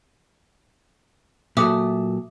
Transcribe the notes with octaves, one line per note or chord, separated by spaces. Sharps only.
A#2 F#3 A3 E5 D6 D#6